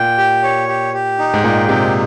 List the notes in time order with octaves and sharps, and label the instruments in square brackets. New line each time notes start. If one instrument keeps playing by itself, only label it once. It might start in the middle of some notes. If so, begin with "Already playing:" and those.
Already playing: [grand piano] A#2 [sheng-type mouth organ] G5
[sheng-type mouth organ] G4
C#5
G4
G4
D#4
[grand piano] G#2
[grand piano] A#2 [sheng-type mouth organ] G5
[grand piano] C3 [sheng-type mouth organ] D#4